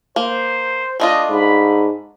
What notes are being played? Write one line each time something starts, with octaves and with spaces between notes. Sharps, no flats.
A#3 C5
A3 D4 F4 D#5
G#2 B5